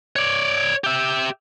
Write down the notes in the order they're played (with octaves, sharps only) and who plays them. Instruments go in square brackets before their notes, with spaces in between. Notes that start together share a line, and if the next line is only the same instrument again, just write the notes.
[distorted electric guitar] C#5 D5
G4 E5